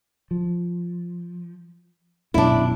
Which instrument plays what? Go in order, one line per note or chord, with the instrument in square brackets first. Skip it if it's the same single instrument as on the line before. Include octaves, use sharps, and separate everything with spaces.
[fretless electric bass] F3
[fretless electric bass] D#1 F#2 B2 [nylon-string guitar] D4 E4